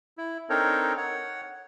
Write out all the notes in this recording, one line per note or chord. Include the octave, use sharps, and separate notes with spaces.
E4
C4 D4 D#4 A4 A#4 C#5
C#5 F#5